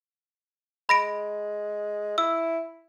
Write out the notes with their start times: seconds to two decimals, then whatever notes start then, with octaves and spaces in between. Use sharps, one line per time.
0.89 G#3 B5 A#6 D7
2.18 E4 E6